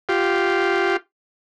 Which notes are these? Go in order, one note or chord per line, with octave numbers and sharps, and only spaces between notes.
F4 G4